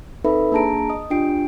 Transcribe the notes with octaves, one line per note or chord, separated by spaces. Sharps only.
C4 D#4 A4 B4 E5 B5
A#3 D4 G#4 A5 A#5 D7
D#5 D#6
D4 F4 G4 G5 C7 D7